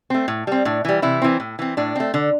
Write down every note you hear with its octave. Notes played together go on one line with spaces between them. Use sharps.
A3 C4
A2
G3 C4
A2 D4
E3 G3
C3 E3 E4
E3 C4
A2
E3 C4
A2 D4
A3 C4
D3